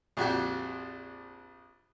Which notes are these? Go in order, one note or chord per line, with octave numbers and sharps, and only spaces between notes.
A#1 F2 F#4 G4